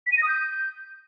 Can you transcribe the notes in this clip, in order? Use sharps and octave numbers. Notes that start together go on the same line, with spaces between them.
B6
D#7
A#6
D#6
G6